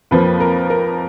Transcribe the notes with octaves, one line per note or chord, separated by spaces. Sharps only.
F2 F3 A#3 B4
A#4
A#4